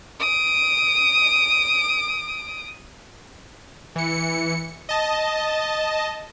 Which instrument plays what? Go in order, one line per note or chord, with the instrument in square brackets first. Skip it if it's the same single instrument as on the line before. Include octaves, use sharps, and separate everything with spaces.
[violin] D#6 D7
[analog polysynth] E3 C#7
D#5 A5